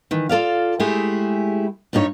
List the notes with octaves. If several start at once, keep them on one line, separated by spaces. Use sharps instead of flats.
D#3 E3
F4 A4 D5 F5
G#3 A3 E4 G4 G#4
G2 G3 D#4 G4 C#5